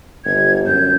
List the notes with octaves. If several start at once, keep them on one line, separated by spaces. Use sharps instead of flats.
G1 G#6
F#2 G6